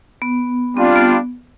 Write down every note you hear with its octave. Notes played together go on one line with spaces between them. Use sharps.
B3
G3 C4 D4 F4
B3